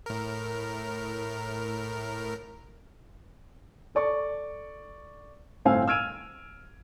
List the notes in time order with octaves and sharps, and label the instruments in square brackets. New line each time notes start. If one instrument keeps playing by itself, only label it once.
[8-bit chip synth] A2 A#4
[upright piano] A4 D5 C#6
G1 A2 C4 F5 G#5 E6
E6 F6 G#6 D7 D#7 F7